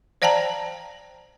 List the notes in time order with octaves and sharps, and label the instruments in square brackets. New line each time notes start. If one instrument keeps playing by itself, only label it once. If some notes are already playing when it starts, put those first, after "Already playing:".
[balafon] C5 D5 F5 G5 A5 A#5